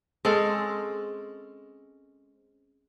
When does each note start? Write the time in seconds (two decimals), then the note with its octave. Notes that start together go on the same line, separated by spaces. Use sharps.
0.25 G#3 C4 C#4 A4